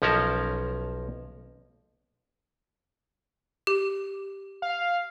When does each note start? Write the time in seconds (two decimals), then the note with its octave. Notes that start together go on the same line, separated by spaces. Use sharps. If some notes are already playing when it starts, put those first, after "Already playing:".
0.02 B1 F3 C#4 A#4 A5
3.67 G4
4.62 F5